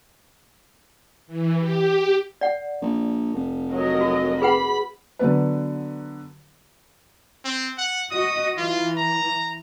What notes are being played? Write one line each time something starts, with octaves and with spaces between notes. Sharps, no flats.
E3
G4
D5 F#5
A#1
F1
F#3 A#4 D#5
F#4
G#4 B4 F#5 B5
D3 F#3 B3 B4
C4
F#5
F#4 D#5 D#6
E3 F4
A#5